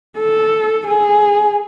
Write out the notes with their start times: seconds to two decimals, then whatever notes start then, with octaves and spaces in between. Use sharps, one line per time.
0.19 A4
0.88 G#4